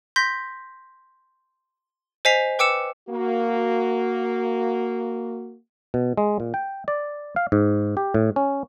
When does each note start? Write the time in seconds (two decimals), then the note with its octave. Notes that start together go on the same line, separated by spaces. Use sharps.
0.16 C6 G6 A#6 B6
2.25 C5 D#5 G#5 B6 C7 F7
2.59 B4 G5 D6 E6 C#7 E7
3.09 A#3 F#4
5.94 B2
6.17 G#3
6.40 A#2
6.54 G5
6.88 D5
7.36 F5
7.52 G#2
7.97 G4
8.14 A2
8.36 C#4